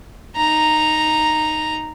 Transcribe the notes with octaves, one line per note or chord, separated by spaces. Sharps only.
D#4 A#5